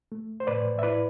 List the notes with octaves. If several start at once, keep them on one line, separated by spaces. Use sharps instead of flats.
A3
C5
A2 B4 D5
E5
E4 B4 D5